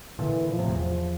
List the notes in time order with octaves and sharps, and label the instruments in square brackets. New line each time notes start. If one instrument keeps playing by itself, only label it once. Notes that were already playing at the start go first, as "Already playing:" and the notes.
[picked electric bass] A#2 D3 [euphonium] E3
[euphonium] F3
[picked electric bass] A2 C3
E2
[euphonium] F3